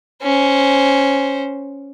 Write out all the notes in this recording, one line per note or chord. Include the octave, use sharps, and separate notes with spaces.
C#4 C5